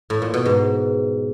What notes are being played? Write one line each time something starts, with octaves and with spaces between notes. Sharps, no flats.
A2
A#2
B2
G#2